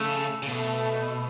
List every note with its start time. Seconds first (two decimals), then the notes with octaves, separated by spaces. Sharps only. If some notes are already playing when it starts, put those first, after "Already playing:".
Already playing: C#3 A3
0.42 C#3
0.48 B2 A3